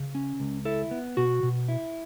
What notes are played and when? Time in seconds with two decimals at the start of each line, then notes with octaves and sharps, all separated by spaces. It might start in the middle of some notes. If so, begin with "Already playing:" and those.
Already playing: C#3
0.15 C#4
0.40 C#2
0.65 E4 A4
0.91 B3
1.17 B2 F#4
1.43 B2
1.68 E4